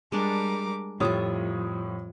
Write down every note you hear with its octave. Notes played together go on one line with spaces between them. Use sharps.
G3 G#3 D4 A#4 D6
F2 A2 G3 F4 C#5 E5 D#6